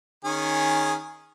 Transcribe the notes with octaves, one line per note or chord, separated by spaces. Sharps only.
D#3 C#4 G#4